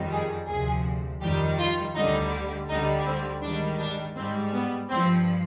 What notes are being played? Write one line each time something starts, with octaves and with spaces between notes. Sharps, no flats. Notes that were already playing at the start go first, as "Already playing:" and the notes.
Already playing: F2 D#3 G3
G#4
D2 C3 F3 G#4
F2 D#3 G3 G4
F4
D2 D3 G3 D#4
D2 D3 G3 D#4
C4
G#2 D#3 G3 D4
D4
G#2 G3 C4
B3
G2 F3 C4